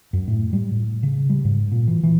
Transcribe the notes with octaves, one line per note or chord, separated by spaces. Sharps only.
F#2
A2
G3
A2
C#3
G3
G#2
A#2
E3
E3